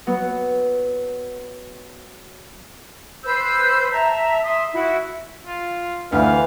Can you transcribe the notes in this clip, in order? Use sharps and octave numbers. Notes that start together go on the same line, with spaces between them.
F#3 B3
B4 C5 E6 G6
E5 A5 A#5
E5 C6 D#6
E4 F#4
F4
D2 E3 F5